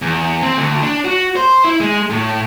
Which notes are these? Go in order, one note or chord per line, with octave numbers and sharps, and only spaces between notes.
E2
C4
D2
D4
F#4
C5
E4
G#3
A2